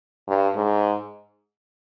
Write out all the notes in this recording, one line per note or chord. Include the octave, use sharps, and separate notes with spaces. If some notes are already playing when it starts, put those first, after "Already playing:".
G2
G#2